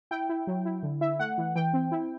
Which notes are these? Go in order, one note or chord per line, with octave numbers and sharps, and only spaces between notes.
E4 G5
E4
F#3
E4
D3
E4 E5
A3 F#5
E3
E3 G5
C4
E4